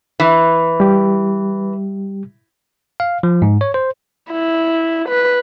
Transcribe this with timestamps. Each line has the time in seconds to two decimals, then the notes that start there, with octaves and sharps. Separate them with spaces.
0.20 E3
0.80 G3 G4
3.00 F5
3.23 F3
3.42 G#2
3.61 C#5
3.74 C5
4.31 E4
5.09 B4